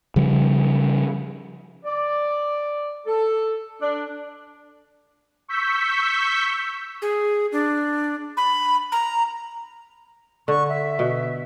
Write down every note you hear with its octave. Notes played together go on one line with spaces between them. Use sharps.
C#3 F3 G3
D5
A4
D4
C#6 E6 G6 B6
G#4
D4
B5
A#5
D3 C#6
E5
B2